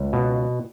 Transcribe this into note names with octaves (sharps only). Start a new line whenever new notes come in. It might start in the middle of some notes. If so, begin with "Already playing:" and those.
Already playing: C#2
B2